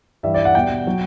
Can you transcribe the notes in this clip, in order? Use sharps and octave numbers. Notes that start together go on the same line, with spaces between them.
G2 E3 G3 E5
D5
F#5
B2 G3 G5
F#3